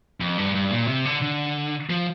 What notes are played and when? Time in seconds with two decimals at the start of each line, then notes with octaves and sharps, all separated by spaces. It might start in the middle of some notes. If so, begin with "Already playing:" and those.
0.20 F2
0.38 G2
0.55 G2
0.71 A#2
0.88 C3
1.05 D3
1.22 D3
1.90 F3